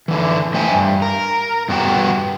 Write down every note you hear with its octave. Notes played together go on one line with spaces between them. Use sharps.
D3 E3
A3 C5 E5 G5 G#5
G2
A#4
G2 B3 F#4 G5